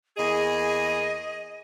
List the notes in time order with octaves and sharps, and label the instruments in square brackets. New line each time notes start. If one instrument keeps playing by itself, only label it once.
[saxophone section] E2 A#3 G#4 [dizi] D#5